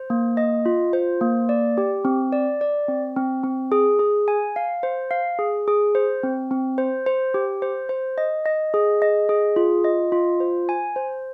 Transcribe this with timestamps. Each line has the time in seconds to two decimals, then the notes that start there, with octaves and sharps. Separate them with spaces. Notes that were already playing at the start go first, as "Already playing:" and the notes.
Already playing: C5
0.10 A#3
0.37 D#5
0.66 F4
0.93 C5
1.21 A#3
1.49 D5
1.78 G4
2.05 C4
2.33 D5
2.61 D5
2.88 C4
3.16 C4
3.44 C4
3.72 G#4
3.99 G#4
4.28 G#5
4.56 F5
4.83 C5
5.11 F5
5.39 G#4
5.68 G#4
5.95 C5
6.23 C4
6.51 C4
6.78 C5
7.06 C5
7.34 G4
7.62 C5
7.89 C5
8.18 D#5
8.46 D#5
8.74 G#4
9.02 D#5
9.29 G#4
9.56 F4
9.84 D#5
10.12 F4
10.40 C5
10.69 G#5
10.96 C5